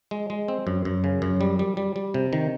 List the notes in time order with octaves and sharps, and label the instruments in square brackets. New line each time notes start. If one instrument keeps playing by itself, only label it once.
[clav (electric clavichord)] G#3
G#3
C4
F#2
F#2
C#3
F#2
G3
G3
G3
G3
C3
D#3